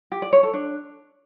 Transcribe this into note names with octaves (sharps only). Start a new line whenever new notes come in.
G4
D5
C#5
A4
D4